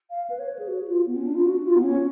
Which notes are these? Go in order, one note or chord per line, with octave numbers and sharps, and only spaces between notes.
F5
B4
C#5
B4
G#4
F#4
F4
B3
C#4
D4
F4
F#4
F4
B3
C#4